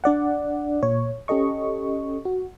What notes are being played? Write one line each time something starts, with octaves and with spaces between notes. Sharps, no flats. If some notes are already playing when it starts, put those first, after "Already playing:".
D4 D5 F#5
A#2 C#5
C#4 G4 A4 D#5 C#6
F#4